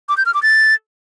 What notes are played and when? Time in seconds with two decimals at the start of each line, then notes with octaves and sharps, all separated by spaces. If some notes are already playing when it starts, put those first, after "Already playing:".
0.09 D6
0.17 G6
0.26 F6
0.34 D6
0.43 A6